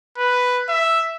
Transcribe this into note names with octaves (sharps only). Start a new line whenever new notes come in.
B4
E5